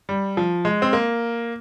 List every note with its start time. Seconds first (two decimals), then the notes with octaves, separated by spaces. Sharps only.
0.09 G3
0.37 F3
0.65 G#3
0.82 C4
0.93 A#3